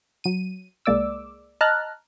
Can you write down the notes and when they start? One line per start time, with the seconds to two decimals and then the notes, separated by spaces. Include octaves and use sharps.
0.24 F#3 D#7
0.86 C2 G#3 A#3 D5 D6 E6
1.61 D#5 A5 A#5 F6 F#6